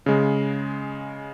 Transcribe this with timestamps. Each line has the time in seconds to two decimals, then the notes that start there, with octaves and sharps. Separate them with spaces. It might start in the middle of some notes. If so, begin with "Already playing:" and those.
0.06 C#3 G#3